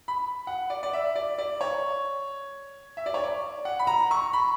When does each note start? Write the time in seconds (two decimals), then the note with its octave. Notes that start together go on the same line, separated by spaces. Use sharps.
0.08 B5
0.47 F#5
0.70 D5
0.83 D5
0.93 E5
1.15 D5
1.38 D5
1.61 C#5
2.97 E5
3.06 D5
3.14 C#5
3.24 D5
3.65 F#5
3.79 B5
3.87 A#5
4.11 C#6
4.33 B5